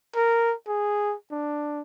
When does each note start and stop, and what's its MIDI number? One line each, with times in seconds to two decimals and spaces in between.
0.16 0.54 70
0.68 1.15 68
1.32 1.82 62